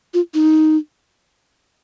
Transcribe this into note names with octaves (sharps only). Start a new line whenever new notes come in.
F4
D#4